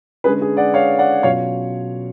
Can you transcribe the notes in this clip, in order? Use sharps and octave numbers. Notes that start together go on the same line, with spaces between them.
D3 G#3 C#4 G#4 B4
G#4
D5 F#5
C#5 F5
D5 F#5
B2 F#3 C#4 F4 C#5 F5